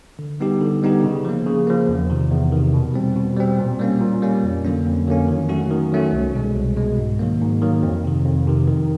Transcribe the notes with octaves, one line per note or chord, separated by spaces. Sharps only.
D3
G3 B3 D#4 G4
D3
G3 B3 D#4 G4
C#3
F3 A#3
C#3
F3 A#3
E2
C3 D#3
E2
C3 D#3
B2
G3 C4
B2
G3 C4
A#2
G3 A#3 C#4
A#2
G3 A#3 C#4
F2
D3 F#3 A#3 C#4
F2
D3 F#3 A#3 C#4
D#3
F#3 A3 C#4 F#4
D#3
F#3 A3 C#4 F#4
C2
B2 G#3
C2
B2 G#3
G#2
D#3 F#3 A#3
G#2
D#3 F#3 A#3
F2
C3 D#3
F2
C3 D#3
D#3